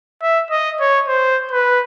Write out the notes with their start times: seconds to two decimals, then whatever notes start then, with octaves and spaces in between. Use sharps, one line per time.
0.22 E5
0.51 D#5
0.80 C#5
1.08 C5
1.51 B4